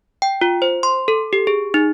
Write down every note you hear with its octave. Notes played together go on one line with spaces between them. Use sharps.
G5
F4
C5
C6
A4
G4
G#4
D#4